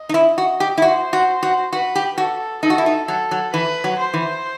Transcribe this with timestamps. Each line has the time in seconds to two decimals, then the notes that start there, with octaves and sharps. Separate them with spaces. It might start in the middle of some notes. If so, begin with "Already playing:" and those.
Already playing: D#5
0.09 D#4
0.14 E4
0.38 F#4
0.60 G4
0.78 E4
0.82 F#4 C5
1.13 F#4
1.43 F#4
1.73 F#4 B4
1.95 G4
2.18 F#4 A4
2.63 D#4 A4
2.70 F#4
2.78 E4
2.86 D#4
3.08 F#3 A4
3.31 F#3
3.53 E3 B4
3.84 F#3
3.99 C5
4.14 E3